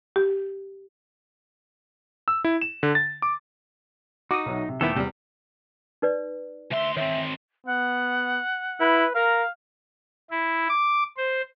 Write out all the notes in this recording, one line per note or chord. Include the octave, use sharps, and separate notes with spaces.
G4
E6
E4
E7
D3
A6
D6
D#4 F#4 D6 D#6
B1 F#3 E5
C3
D#1 D#3 A3 B3 E4 G4 A4
E2 C3 G3
D#4 B4 D5
D2 E5 C6
D#3 C4 C#5 E5
B3 F#5
E4 B4
A#4 F5 A#5
E4
D6
C5